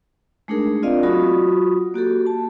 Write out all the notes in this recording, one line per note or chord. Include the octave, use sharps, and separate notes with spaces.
G#3 A3 D4 D#4 G#4 A#4
C4 F4 D5 D#5 F5
F#3 F4 F#4 B5 C#6 D#6
A#3 F#4 G4 A4
A5